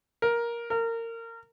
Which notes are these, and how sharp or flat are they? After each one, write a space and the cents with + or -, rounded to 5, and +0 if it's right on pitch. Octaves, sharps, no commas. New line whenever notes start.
A#4 +10
A#4 -25